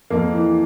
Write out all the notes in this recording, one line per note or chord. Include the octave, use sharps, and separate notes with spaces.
F2 A#3
E3